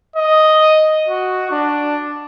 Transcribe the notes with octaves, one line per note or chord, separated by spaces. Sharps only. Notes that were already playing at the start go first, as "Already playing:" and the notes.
D#5
F#4
D4